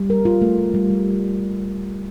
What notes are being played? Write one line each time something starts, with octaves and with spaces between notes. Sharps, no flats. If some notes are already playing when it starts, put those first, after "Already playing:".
Already playing: G3
A#4
F4
A3
G3
G3
G3